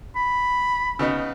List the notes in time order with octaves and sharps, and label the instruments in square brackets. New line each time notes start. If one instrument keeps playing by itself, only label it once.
[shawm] B5
[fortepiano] C#3 B3 D#4